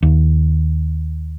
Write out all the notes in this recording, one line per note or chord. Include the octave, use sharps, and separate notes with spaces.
D#2